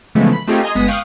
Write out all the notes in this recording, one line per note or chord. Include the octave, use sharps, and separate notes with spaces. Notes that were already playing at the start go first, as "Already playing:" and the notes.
C#3 E3 F3 G#3 A3 B3
B5
A3 C4 D#4 F4 G4 G#4
D#5 G#5 A#5 C6 D#6
G1 G#3 B3 D#6 B6
F5 G5 C#6 D#6 F#6